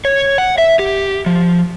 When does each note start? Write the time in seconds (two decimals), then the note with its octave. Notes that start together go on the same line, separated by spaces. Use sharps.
0.05 C#5
0.38 F#5
0.58 E5
0.79 G4
1.26 F3